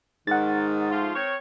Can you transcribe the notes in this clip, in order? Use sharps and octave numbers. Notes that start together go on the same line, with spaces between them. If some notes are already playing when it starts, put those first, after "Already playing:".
G#2 D#3 F#5 A6
F3 A3 F4
C4 A#4 C#5